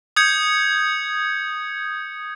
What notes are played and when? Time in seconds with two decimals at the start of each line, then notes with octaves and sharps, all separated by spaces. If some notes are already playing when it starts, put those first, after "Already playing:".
0.16 D#6 G6 G#6 C#7